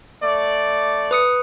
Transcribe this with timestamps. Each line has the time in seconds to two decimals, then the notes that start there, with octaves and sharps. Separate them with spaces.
0.22 A3 D5
1.11 B4 D#6 C#7